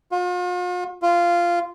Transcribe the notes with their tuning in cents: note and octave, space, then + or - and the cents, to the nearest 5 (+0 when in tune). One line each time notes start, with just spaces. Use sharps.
F4 +45
F4 -10